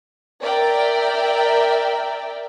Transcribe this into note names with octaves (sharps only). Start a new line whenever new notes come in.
A#4 D5 E5 G5